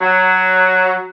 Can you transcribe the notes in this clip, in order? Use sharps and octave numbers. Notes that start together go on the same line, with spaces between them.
F#3